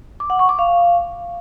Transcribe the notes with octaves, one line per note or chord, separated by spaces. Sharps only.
D6
F#5
C#6
D6
F5